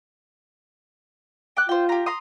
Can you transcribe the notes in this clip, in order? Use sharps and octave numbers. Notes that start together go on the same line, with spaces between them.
G5 D6 F#6
F4 C5 G5
G4 A#5
A#5 C6 D#6